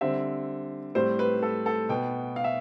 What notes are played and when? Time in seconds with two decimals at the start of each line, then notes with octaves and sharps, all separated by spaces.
0.01 D3 G3 C4 E5
0.95 A2 G3 C4 C5
1.19 B4
1.43 A4
1.66 A4
1.89 B2 B3 G5
2.36 F5
2.44 E5